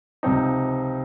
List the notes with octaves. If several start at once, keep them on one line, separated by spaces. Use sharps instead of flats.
C#2 C3 F3 C4 D#4